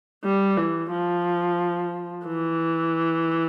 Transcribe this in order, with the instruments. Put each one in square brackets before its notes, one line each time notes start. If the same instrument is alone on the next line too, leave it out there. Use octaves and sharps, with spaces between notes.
[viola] G3
E3
F3
E3